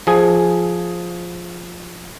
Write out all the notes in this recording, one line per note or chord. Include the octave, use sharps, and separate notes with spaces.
F3 G#4